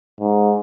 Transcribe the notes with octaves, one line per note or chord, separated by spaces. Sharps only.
G#2